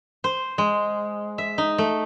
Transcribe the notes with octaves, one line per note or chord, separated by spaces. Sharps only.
C5
G#3
E5
D#4
A3